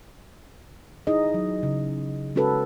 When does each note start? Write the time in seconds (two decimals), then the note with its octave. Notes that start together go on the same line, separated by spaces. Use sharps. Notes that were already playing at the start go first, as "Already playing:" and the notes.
1.07 D#4 E4 G#4 D#5
1.34 F#3
1.63 C#3
2.35 G#3 C#4 F#4 A4 B4